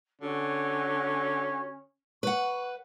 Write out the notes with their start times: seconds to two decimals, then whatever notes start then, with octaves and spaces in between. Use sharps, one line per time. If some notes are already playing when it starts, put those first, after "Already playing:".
0.21 D3 C#4 F#4
2.23 B4 F#5 C#6